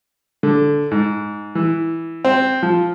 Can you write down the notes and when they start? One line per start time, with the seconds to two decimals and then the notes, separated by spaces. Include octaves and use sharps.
0.43 D3
0.91 G#2
1.55 E3
2.25 C4
2.63 F3